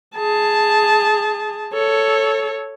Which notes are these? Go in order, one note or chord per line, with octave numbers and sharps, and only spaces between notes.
G#4 A5
A4 C#5